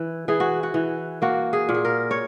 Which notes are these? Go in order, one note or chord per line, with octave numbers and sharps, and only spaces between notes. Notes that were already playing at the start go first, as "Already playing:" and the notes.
Already playing: E3
E3 G#4
F#4
F#4
E3
A#3 F#4
G#4
A#2
G#4
A#4
C#5